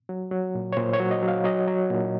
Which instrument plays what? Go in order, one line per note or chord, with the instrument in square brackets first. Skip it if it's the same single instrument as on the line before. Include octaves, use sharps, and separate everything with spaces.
[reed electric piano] F#3
F#3
A#2
C#5
A#2 C5
C#5
F#3
D#5
F#3 F5
F#3 D#5
F#3
A#2